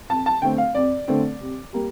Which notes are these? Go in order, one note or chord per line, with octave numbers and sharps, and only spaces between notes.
F2 A5
A5
D3 A3 C4 G5
F5
F2 D5
D3 A3 C4
C3
G3 A#3